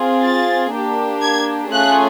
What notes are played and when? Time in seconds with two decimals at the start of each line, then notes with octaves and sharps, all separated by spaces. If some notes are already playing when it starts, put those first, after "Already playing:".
Already playing: C4 F4 G#4
0.24 A6
0.73 A#3 D4 G4
1.23 G#6
1.72 A3 C#4 F4 G#4 F#6